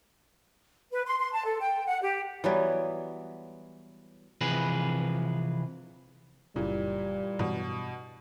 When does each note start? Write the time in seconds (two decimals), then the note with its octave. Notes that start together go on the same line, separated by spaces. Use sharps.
0.92 B4
1.07 C6
1.19 C6
1.33 A5
1.46 A4
1.60 G5
1.87 F#5
2.03 G4
2.44 E3 F#3 G3 B3
4.41 C3 E3 F3 G#4 B4
6.56 F#1 A#2 C#3 E3 G3
7.39 G2 B2 E3 F#3